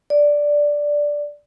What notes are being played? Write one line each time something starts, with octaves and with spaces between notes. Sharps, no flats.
D5